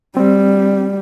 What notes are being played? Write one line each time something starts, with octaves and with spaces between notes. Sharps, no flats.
G3 C4